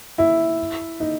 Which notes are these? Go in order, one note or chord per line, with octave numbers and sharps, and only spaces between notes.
E4
D#4